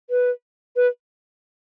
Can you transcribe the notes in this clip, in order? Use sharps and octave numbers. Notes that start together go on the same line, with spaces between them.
B4
B4